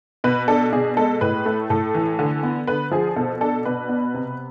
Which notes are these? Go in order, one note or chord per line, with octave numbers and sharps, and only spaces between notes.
B2 B4
D4 A4
B2 G#4
G#3 A4
A2 B4
A3
A2 A4
E3
D3
B3
D3 B4
F3 G#4
B2 A4
D4 A4
B2 B4
B3
C3